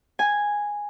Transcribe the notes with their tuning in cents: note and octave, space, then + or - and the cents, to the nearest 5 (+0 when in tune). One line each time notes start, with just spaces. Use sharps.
G#5 -5